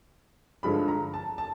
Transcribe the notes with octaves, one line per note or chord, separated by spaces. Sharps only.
G2 D3 F3 G#3 B5
A#5
A5
A5